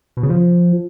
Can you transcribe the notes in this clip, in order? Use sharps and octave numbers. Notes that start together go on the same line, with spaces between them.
B2
C#3
F3